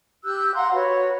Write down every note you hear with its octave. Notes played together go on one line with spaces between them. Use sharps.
G4 E6 F#6 G6
F5 F#5 A#5 C6
F#4 B4 C#5